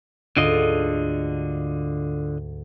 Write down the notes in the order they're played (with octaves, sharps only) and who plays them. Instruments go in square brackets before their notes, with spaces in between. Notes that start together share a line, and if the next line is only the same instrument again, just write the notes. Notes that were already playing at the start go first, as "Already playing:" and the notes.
[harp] D2 G#2 [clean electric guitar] D3 F4 D#5